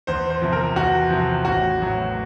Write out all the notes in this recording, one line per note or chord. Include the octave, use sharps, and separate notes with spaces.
E2 C5
C5
C3 F3
A#4
E2 F#4
C3 F3
A1 F#4
A2 F#3